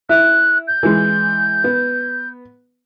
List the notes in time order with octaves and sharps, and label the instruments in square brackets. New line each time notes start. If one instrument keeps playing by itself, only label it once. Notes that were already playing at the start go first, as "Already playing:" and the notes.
[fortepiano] E4 E5 [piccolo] F#6
[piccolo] G6
[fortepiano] E3 G#3
B3